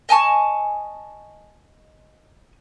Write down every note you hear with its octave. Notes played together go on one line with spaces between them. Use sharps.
D#5 G#5 A5 C#6